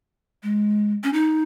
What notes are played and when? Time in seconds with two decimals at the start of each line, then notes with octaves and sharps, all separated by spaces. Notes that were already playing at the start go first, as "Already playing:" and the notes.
0.43 G#3
1.04 C#4
1.13 D#4